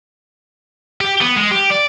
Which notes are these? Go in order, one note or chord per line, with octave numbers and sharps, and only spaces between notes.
G4
B3
G#3
G4
D5